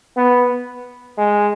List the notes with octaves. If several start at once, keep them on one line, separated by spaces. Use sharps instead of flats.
B3
G#3